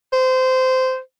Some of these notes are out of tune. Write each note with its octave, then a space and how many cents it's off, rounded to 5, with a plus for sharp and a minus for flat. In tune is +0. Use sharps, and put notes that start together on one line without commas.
C5 -20